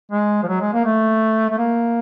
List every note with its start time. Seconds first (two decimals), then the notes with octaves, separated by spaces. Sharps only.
0.12 G#3
0.43 F3
0.48 F#3
0.61 G#3
0.73 A#3
0.85 A3
1.50 A3
1.58 A#3